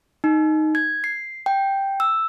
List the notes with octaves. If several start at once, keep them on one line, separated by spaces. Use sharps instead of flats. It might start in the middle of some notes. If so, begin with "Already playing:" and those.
D#4
G#6
C7
G5
E6